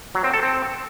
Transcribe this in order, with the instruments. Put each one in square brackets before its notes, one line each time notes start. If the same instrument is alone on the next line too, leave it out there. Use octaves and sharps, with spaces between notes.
[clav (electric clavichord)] F#3
C4
A4
C4